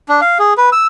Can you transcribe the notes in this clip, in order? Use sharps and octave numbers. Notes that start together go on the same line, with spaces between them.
D4
F5
G#4
B4
E6